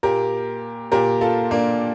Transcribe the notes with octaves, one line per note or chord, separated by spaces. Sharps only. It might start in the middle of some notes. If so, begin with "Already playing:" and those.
A#2 G4 A#4
A#2 G4 A#4
F4 A4
A#3 D4